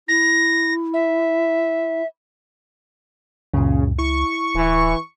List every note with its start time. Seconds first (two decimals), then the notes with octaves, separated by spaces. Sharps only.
0.08 E4 A#6
0.94 E5
3.54 C#2 F#2 A#2 C#3
3.99 E4 C#6
4.55 D1 E3